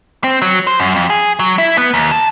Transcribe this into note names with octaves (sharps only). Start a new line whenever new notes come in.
C4
F#3
C5
F#2
F2
G#4
F#3
E4
B3
D#2
A5